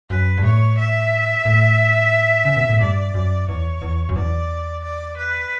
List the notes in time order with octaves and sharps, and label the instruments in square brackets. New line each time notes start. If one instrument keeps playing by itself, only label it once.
[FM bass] F#2 [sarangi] B4
[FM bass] G2
[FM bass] A2 [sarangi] C#5
[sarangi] E5
[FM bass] A2
C#3
B2
A2
[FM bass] G2 [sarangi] D5
[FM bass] F#2
[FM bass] E2 [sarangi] C#5
[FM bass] E2
F#2
[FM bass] E2 [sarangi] D5
[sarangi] D5
B4